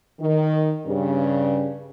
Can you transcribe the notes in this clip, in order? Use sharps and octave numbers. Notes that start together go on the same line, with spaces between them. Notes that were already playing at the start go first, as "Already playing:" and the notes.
D#3
G2 C#3